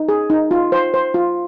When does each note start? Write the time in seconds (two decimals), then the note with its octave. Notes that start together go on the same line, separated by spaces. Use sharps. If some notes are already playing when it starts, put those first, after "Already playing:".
Already playing: D#4
0.09 G#4
0.30 D#4
0.51 F4
0.72 C5
0.94 C5
1.14 F4